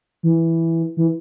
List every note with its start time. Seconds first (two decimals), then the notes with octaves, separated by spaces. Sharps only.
0.23 E3
0.97 E3